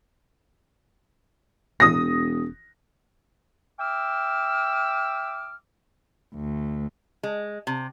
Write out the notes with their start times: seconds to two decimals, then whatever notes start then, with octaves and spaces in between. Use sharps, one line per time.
1.80 E1 D#6 A#6
3.80 E5 G5 D6 E6 F6
6.34 D2
7.23 G#3
7.67 C3